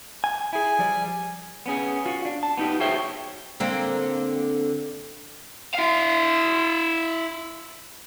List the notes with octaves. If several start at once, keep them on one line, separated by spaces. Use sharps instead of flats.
G#5
E4 G#4 G#5
F3 G3 D5
B3 C#4 G#4
F4 F#4
D4
A5
B3 D#4 G4
F#4 G#4 C5 C#5 E5 G5
D3 A#3 C4
E4 F5